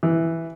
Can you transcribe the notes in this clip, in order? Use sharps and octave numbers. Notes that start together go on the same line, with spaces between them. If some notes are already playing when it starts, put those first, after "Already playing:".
E3